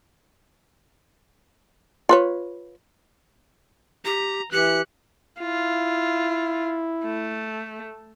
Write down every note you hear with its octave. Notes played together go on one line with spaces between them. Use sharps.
F4 B4 C#5
G4 A#5
E3 G4 F#6 C#7
E4 F4
A3